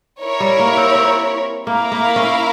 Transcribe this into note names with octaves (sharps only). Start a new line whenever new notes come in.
E4 A#4 C#5
G3
A#3
C4
C4
A#3 E4 A#4 F5
A#3
C#4